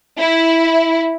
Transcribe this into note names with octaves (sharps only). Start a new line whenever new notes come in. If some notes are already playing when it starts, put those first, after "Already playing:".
E4